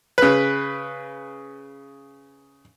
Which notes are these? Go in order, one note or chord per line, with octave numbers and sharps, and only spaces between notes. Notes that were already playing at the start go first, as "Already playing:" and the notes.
C#3 B4